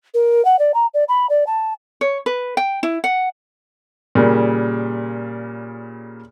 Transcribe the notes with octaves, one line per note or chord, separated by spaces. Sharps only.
A#4
F#5
D5
A#5
D5
B5
D5
A5
C#5
B4
G5
E4
F#5
A#2 C#3 G3